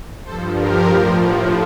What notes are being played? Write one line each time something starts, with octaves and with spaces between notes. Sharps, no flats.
G2 F3 A4 C5
G4 A#4
A2 F3